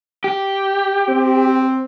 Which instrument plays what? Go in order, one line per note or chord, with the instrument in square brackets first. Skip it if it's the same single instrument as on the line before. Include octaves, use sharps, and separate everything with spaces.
[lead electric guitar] G4
[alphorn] C4